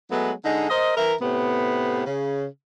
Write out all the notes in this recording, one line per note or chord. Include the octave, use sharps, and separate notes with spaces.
F#3 G#3 A3 B3
D3 G#3 D#4
A#4 C5 D#5
E3 E4 A#4
A2 C3 B3
C#3